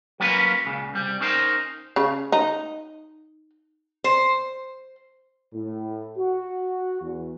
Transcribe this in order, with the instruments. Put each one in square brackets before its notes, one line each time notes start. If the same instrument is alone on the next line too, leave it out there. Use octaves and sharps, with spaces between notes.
[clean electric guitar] F#3 A#3 C#4 F4 B4
C#2 A#2 C#3
C2 G3
C#4 D#4 A#4 C5
[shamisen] C#3
D#4
[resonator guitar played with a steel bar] C5
[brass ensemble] A2
F#4
E2